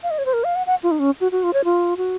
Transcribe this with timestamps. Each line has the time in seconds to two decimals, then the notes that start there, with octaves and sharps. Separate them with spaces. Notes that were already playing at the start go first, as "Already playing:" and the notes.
0.03 F5
0.11 D#5
0.18 C#5
0.26 C5
0.33 A#4
0.44 F5
0.56 F#5
0.67 F#5
0.83 F4
0.91 D#4
0.99 C#4
1.21 F#4
1.32 F#4
1.43 F4
1.54 C#5
1.64 F4
1.97 F#4